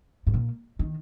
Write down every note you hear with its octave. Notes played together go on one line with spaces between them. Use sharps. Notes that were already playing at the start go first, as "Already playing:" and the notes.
G#2
A#2
D#3